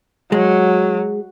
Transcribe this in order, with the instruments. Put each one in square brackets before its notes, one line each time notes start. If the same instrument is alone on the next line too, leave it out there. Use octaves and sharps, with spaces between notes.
[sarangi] F#3 [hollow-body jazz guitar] G#3